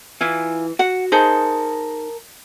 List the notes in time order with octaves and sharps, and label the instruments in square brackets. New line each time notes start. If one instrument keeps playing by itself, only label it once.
[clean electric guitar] E3 [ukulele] E4 F4 G#5
[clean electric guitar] F#4 [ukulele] F#5
[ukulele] D#4 G#4 C5 [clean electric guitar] A#4 A5